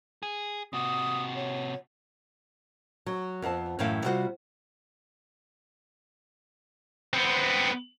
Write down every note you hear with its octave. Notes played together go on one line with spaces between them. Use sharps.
G#4
C3 F#4 D#6
C#5
F#3
F2 B3 C4 A5
F#2 A2 E3 E4 F5 G5
C3 G3 F4 F#4 C5
B3 C4